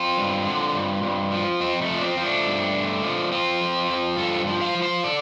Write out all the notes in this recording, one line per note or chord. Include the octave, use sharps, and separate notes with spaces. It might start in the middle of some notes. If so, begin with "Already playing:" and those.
Already playing: C4 F4
G2
D3
G2
G2
F3
F2 C4
A3
F3
D4
C4
F3
A3 D4
G2
D3
F3
F3 C4 F4
F2
F3
G2 F4 A4
F3
C5 F5
F3
C5 F5
A4 D5